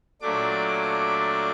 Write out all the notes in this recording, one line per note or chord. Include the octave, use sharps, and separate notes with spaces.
A#2 F#3 A3 D4 D6
D6